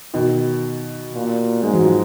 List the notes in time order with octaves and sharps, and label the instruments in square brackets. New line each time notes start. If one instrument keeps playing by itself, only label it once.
[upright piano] B2 D#3
[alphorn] A#2
[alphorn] G#2 [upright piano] G#3
[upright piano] F#3
F3